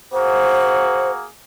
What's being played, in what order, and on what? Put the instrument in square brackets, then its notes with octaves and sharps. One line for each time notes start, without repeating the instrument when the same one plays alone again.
[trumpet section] A#3 F#4 G#4 [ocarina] C5